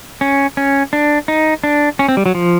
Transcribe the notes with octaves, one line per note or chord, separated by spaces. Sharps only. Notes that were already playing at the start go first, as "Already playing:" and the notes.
C#4
C#4
D4
D#4
D4
C#4
C4
G3
F#3
F3